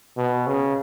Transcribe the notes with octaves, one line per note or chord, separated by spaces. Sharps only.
B2
C#3